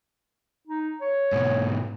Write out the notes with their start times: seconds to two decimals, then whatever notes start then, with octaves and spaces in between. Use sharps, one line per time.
0.67 D#4
1.01 C#5
1.32 G#2 B2